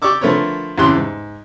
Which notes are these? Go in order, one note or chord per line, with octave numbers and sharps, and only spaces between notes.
G4 D5 C#6 D6 E6
D3 F3 A3 A#4 B4 C#5
E2 A2 C#3 G4 C6 F#6
G#2